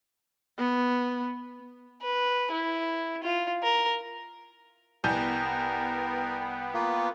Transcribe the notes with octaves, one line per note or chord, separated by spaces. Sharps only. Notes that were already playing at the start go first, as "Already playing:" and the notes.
B3
B4
E4
F4
A#4
C2 B3 A#4 G5 G#5 G6
A#3 F4